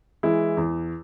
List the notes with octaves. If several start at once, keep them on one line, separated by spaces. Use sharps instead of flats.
E3 G#3 E4
E2